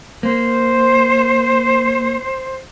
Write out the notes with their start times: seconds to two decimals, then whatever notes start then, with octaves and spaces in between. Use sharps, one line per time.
0.23 A#3 C5